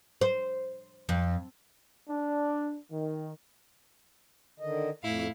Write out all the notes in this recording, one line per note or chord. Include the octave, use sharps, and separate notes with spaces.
C5
F2
D4
D#3
D3 D#3 D#5
F2 A2 E4 F5